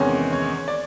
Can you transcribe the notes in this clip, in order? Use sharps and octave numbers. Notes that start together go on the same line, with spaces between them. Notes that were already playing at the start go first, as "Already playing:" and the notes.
Already playing: E2 C3 D#3 G#3 C#4
C#5
D5